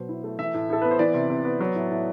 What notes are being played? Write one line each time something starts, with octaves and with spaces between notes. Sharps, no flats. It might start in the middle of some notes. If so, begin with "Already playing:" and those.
Already playing: B2 F#3 C5
E4
A3
E3 E5
A2
A2 A4
B3 B4
C5
E3 D5
C3
C3
B3
F#3
A2
A2